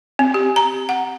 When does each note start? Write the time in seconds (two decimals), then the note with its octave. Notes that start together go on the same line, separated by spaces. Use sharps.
0.19 C4
0.34 G4
0.56 A#5
0.89 F#5